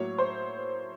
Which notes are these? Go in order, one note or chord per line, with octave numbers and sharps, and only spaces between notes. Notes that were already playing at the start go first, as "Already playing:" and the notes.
Already playing: A2 F#3 A#3 C#5
C5